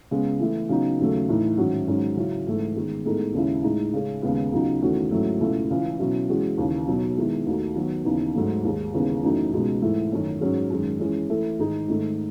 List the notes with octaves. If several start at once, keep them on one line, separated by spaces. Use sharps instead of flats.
C#3 G#3 B3
E3 A3 E4
C#3 F#3 B3 D#4
D#2 C#3 F#3 A3
A2 E3 A3 D#4
G#2 D#3 F#3 C#4 F#4
G#2 D#3 F#3 C#4
C#3 F#3 C#4 E4
G#2 E3 A3
D#3 G#3 B3
A2 G#3 B3 D#4 A4
D#2 C#3 G#3 C#4 E4
A2 G#3 D#4
C#3 G#3 C#4 G#4
D#2 C#3 G#3 B3
C#2 C#3 F#3 B3 D#4
E2 D#3 A3 C#4 F#4
G#2 F#3 A3 C#4 E4
C#2 B2 A3 E4
C#2 C#3 E3
B2 F#3 C#4 E4
E3 G#3 C#4 F#4
D#2 C#3 E3
B2 F#3 B3 D#4 F#4
D#3 G#3 B3 E4
D#2 D#3 A3 D#4 F#4
D#3 F#3 B3
D#2 C#3 E3 B3 D#4
G#2 F#3 A3
D#2 D#3 G#3
D#2 C#3 E3 G#3 B3
F#2 E3 A3 D#4 F#4
C#2 B2 G#3 D#4
G#2 E3 A3 E4
F#2 D#3 A3 C#4
G#2 F#3 C#4 G#4
F#2 D#3 G#3
E3 G#3 C#4
E3 A3 E4 A4
G#2 D#3 G#3 D#4 G#4
G#2 D#3 A3 D#4